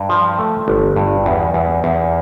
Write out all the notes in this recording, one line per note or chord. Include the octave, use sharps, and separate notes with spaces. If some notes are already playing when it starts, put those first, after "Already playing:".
Already playing: G2
F3
A3
G1
G2
E2
E2
E2